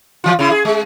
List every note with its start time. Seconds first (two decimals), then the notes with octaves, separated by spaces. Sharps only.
0.24 E3 F4
0.39 C#3 E4
0.51 G#4
0.65 G#3